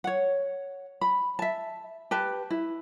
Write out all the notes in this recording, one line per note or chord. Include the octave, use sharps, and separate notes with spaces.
C#5 F#5
B5
E5 A5
G4 B4 A5
E4